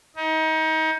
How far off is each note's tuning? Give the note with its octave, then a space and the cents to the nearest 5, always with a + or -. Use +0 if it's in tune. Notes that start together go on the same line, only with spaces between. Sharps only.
D#4 +30